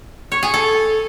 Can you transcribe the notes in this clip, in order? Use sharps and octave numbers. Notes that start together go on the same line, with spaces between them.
C#5
G#4
A4